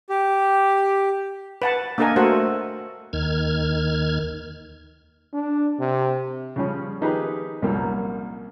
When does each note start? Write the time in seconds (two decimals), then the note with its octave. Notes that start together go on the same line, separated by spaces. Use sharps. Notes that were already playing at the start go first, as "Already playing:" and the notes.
0.09 G4
1.62 B4 F#5 A5
1.98 A#3 D4 A4 A#4 D#5 G#5
2.16 A3 F#4 A4 A#4 C5 F#5
3.13 D#2 D#3 F6 G#6
5.33 D4
5.79 C3
6.56 C#3 F3 G3 C#4
7.01 D#3 F3 D#4 G4 G#4 B4
7.62 C2 F#2 A#2 F3 G3 A#3